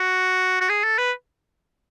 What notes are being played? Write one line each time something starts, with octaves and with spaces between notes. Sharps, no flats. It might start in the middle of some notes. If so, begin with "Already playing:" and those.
Already playing: F#4
F#4
G#4
A4
B4